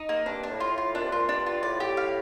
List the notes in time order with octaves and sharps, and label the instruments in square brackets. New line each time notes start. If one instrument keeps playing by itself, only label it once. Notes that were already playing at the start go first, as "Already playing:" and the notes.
Already playing: [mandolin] D#4
A#3
[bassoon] G2 [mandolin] D4
[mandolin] D4
[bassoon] A2
[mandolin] F4
[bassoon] A2
[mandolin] F4
[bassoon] A#2 [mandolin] D4
[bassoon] C3
[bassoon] A#2 [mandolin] F4
[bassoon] G2 [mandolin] D4
[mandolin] F4
[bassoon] A2 [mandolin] D5
[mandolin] G4
F5